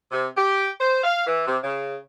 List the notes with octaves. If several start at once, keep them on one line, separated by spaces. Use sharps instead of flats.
C3
G4
C5
F5
E3
C3
C#3